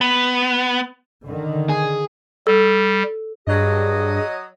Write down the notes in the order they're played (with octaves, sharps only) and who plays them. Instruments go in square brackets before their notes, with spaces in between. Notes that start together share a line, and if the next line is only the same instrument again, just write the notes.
[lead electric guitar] B3
[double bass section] D3 D#3
[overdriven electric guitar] G#4
[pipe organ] G3 [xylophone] A4
[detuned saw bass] G2 [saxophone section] F#3 D#5 [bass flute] G#4